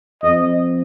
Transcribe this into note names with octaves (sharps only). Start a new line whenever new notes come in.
F2 D#5